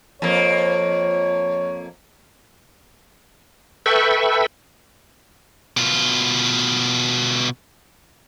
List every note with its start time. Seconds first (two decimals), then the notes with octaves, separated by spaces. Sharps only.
0.22 F2 A#3 C#5
3.86 A4 B4 E5 G5 B5 C#6
5.77 B2 F4